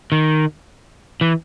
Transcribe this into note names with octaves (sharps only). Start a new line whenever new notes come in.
D#3
E3